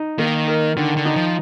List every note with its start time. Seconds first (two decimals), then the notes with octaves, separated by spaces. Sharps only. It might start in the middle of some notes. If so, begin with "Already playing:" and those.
Already playing: D#4
0.19 D#3 A#3
0.48 A#4
0.77 D3 D#3
0.97 D3
1.05 D#4
1.16 F3